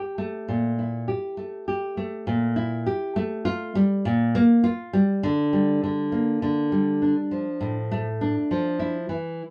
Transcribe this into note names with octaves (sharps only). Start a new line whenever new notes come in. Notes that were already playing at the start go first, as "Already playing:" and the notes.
Already playing: G4
A3
A#2
E4
G4
A3
G4
A3
A#2
E4
G4
A3
F4
G3
A#2
A#3
F4
G3
D3
G3
D3
A#3
D3
G3
D4
F3
A2
A3
D4
F3
E4
E3